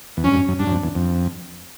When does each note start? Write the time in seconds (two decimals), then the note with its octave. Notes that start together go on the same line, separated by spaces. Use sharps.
0.17 E2
0.24 F2 C#4
0.31 G2
0.36 F#2
0.48 F#2
0.59 G2 D4
0.67 F#2
0.72 F2
0.83 E2
0.95 F2